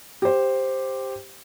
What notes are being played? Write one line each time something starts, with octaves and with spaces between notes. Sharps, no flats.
G4 C5